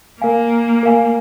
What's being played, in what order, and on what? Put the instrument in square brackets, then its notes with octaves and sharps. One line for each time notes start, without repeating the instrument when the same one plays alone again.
[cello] A#3 [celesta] A#4 F5 G#5
[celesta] A#4 F5 G#5